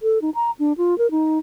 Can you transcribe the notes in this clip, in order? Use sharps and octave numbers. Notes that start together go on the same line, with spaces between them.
A4
D#4
A#5
D4
F4
A#4
D#4